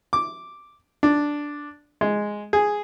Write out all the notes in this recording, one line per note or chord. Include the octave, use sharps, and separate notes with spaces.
D6
D4
G#3
G#4